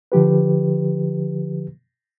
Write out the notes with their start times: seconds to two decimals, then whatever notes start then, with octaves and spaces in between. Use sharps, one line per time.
0.12 D3 F3 G4 B4